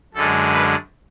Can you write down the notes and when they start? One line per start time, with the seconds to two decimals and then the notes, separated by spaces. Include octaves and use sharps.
0.14 F#2 D3 G#3 A4
0.52 B4